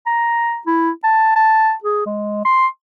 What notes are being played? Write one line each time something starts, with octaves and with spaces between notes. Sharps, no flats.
A#5
E4
A5
A5
G#4
G#3
C6